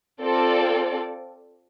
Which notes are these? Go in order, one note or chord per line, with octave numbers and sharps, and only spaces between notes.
C4 F4 A4 D5